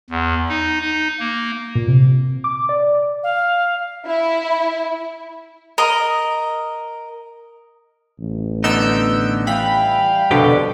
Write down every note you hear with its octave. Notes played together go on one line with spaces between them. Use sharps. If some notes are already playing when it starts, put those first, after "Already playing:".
E2
D#4
D#4
A#3
A#2
C3
D6
D5
F5
E4
A#4 D#5
A1
D3 B3 D#4 E6 G6 D7
E3 G3 F5 G5 B5
C2 F2 B2 D3 G4